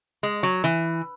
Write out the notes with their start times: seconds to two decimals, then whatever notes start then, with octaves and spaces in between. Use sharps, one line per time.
0.23 G#3
0.43 F#3
0.64 E3